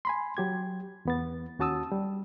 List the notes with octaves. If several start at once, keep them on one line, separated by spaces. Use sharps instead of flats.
G#5 B5 C6
F#3 G4 G#6
E2 B3 A6
D#2 C#4 F#4 A5 D#6 E6
G3